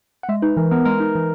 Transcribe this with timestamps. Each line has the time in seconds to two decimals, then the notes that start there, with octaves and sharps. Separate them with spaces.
0.23 F#5
0.29 G#3 E5
0.42 D#4 B4
0.57 E3 A#4
0.71 B3 A#4
0.85 G#3 A#4
1.00 D#4
1.15 E3